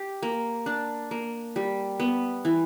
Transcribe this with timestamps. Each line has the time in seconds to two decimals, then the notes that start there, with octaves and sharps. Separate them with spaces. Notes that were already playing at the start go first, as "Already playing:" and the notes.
Already playing: G4
0.22 A#3
0.66 D4
1.11 A#3
1.56 G3
2.00 B3
2.45 E3